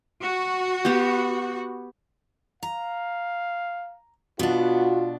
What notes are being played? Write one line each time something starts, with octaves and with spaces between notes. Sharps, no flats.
F#4
B3 G4
F5 A#5
B2 B3 D4 F4 F#4